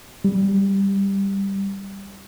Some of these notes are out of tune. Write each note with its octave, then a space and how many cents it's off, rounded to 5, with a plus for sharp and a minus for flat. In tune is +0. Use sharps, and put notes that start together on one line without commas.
G3 +5